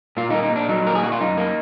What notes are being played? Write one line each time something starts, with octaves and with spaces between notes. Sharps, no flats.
A#2 F4
D#4
A#3
D#4
A#2 D4
F#3 D#4
A#2 A#4
G#4
A#3 F#4
F4
F#2 D#4
A#3